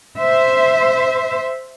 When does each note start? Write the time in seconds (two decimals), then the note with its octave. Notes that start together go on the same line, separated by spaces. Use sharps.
0.18 C5 E5